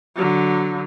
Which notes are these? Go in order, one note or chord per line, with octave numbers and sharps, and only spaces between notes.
D3 F#3